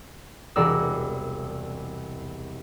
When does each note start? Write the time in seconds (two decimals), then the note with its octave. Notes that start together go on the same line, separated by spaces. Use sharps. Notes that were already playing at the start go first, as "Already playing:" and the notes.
0.56 E1 C2 A#4 D5 E6